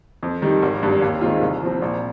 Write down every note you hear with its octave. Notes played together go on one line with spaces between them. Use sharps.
F2
D#3 G3
G#1
G2 G3
D#2
D#3 G#3 C4 F4
C2
C3 F3 C4
A#1